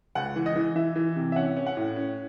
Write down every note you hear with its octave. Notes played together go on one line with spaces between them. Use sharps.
C#2 F#5
E3
D#5
E3
E3 E5
E3
C3
E5
C#4 F#5
C#4
F#5
A2
C#4